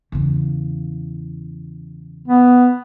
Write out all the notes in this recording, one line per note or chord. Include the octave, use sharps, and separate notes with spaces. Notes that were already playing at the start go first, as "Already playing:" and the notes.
E2 C#3
B3